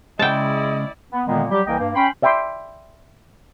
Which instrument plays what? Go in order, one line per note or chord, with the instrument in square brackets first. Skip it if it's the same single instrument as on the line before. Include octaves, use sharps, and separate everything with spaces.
[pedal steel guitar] C#3 G#3 [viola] E4 D5 [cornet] D#5 [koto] G5 A5
[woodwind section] B3
A#2 D3 D#3 G#3 A#3 B3
F#3 G3 G4
C2 E3 A#3 D#5 G5
G2 A#3
C#4 G5 B5 C6
[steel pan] D5 E5 G5 B5 C6 D6